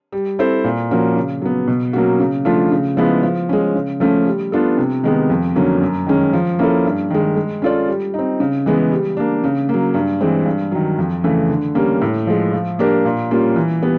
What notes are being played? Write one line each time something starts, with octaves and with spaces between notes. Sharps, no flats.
G3
C4 E4 A4 C5
A#2
F3 A#3 C#4 F#4
C#3
F#3 B3
B2
F#3 A#3 C#4 F#4
C#3
F3 A3 D4 F4
C#3
F3 G#3 B3 E4
F3
G#3 C#4
C#3
F3 A3 C#4
G3
B3 D4 F4 A4
C3
D#3 G#3 B3
F2
D3 F#3 A#3 C#4
F#2
D#3 G#3 C#4
F3
A#3 C#4 E4 A4
G2
D#3 G#3
G#3
C#4 F4 A4 D5
G3
C4 D#4
C#3
E3 G#3 B3
G3
A#3 D4
C#3
F#3 A#3
G2
E3 G#3 C4
G2
D#3 F#3
F2
C#3 E3 A3
D3
G3 A#3 C#4
A2
F3 G#3
F3
A#3 D4 G4 A#4
A#2
G3 A#3 C#4 F4
E3
G3 B3